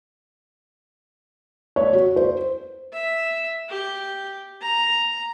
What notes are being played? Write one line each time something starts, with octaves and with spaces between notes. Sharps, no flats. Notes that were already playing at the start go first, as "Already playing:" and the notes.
C#5
F#4
C5
E5
G4
A#5